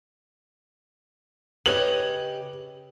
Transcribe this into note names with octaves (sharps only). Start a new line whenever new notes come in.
C#3 G4 B4 C#5 D#5 F#7